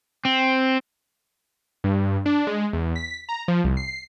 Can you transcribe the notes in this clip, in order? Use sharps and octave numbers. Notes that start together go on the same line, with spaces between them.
C4
G2
D4
G#3
E2
B6
A#5
F3
C2
C7